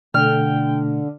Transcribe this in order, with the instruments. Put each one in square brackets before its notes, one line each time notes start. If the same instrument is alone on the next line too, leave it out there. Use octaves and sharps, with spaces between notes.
[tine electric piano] B2 A3 D4 [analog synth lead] D3 [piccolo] G5 [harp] F6